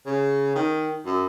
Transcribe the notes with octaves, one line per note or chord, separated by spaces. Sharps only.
C#3
D#3
F#2